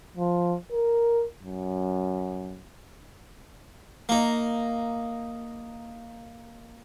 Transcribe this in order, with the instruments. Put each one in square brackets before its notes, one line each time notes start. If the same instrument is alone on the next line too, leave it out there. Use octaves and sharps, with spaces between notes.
[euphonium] F3
A#4
F#2
[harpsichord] A#3 D#4